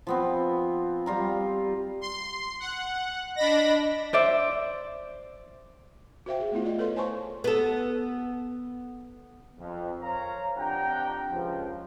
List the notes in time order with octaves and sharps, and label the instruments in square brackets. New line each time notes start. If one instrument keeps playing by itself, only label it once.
[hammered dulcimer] F3 B3 C4
G3 F4 A#5
[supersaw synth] C6
F#5
[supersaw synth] D4 B5 A#6 [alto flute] D#5
[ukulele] C5 D5 E5
[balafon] F#4 A#4 C5 E5 F5 G5
G#4
A3 B3 E4 F4
F4 D5 D#5
A4 B4 C#5 F5 C6
C5 G#5 A5 C6 C#6
[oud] B3 A4
[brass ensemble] F2
A#4 C5 C#5 F5 A#5
F2 D4 G4 F#5 G5 A#5
C#2 F3